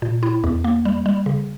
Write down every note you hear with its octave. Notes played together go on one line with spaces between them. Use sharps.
A#2
E4
E2
A#3
G3
G3
C#3